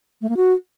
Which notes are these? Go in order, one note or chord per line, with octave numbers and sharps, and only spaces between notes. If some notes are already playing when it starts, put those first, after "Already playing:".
A3
A#3
F#4